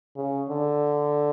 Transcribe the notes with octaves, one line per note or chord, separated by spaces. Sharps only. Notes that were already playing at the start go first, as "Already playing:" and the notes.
C#3
D3